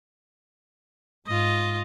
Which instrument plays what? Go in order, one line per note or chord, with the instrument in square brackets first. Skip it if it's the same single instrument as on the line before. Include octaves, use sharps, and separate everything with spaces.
[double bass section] G#2 [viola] F4 D#5